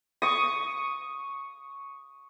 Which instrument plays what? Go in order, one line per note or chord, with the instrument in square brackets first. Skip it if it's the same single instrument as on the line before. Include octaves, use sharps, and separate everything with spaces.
[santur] C#6 D#6